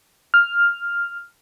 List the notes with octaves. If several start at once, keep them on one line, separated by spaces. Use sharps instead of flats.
F6